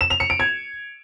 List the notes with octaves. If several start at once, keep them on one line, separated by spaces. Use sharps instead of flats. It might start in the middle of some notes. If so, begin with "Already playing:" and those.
E7
F7
C#7
D7
G#6